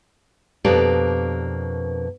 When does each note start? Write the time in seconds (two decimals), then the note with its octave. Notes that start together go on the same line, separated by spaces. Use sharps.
0.64 F2 B2 A#3 D4 G4 D5